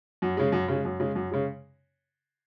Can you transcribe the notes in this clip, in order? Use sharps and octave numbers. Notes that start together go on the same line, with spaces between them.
F#2
C#3 G#3
F#2
C#3 G#3
F#2
C#3 G#3
F#2
C#3 G#3